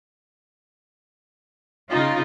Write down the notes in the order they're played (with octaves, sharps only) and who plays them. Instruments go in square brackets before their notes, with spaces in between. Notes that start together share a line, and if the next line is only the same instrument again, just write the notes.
[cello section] C#3 F4 [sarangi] D#4